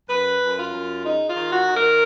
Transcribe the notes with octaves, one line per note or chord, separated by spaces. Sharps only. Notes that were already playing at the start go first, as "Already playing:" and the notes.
F#2 B4
F#2
F4
F#2
G#3 D#4
F4
D#3
F#4
D#3
A#4